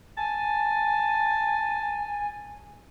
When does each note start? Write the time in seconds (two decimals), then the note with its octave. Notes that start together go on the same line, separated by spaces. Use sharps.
0.17 G#5 A5